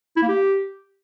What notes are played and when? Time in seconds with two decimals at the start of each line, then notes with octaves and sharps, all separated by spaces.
0.16 E4
0.22 A#3
0.28 G4